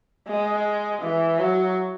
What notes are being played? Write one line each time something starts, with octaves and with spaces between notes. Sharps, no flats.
G#3
E3
F#3